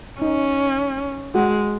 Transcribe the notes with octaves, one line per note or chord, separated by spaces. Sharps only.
C#4 D#4
G#3 F#4